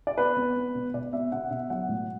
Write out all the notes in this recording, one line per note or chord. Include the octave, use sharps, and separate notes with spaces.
D5
B3 B4
B3
B3
B2
B2 D5
B3 E5
B2 F#5
B2 E5
F#3 F#5
A2